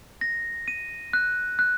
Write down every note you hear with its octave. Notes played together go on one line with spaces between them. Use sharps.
A#6
D#7
F#6
F#6